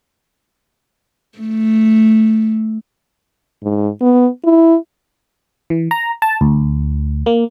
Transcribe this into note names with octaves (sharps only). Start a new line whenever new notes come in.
A3
G#2
B3
E4
E3
A#5
A5
D2
A#3